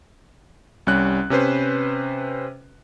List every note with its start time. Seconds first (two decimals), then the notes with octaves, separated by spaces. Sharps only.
0.87 C2 G3 C#4 F#6
1.30 C3 C#4 B4 C5